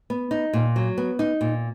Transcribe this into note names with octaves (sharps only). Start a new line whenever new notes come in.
B3
D#4
A#2
F#3
B3
D#4
A#2